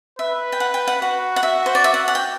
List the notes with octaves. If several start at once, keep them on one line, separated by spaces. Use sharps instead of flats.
B4 E5
G5
F#5
G5
F#5
F#4 F#5
F#5
F#4 E5
C5
D5
E5
F#5
F#5
G5